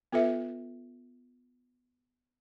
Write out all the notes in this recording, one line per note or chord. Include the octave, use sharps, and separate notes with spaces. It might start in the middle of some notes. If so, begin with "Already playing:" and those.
B3 F4 A4 B4 E5